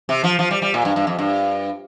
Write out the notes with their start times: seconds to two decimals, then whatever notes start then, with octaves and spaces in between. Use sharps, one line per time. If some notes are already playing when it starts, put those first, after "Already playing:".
0.09 C3
0.24 F3
0.39 F3
0.51 G3
0.62 G3
0.74 A#2
0.85 G2
0.96 G2
1.07 F2
1.18 G2